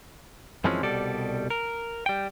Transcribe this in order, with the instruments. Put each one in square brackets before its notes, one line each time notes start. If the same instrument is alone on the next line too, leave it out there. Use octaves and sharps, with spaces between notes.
[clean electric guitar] F#2 E3 F3 G#3 C4 C#4
C2 B2 G3 A4 D5
A#4
G3 G5